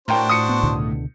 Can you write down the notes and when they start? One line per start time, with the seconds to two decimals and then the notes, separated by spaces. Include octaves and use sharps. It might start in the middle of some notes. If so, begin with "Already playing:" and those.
0.08 A2 D4 F#4 A#4 C5 G5
0.30 D#6 C#7
0.49 B3
0.63 C#2 B2 D3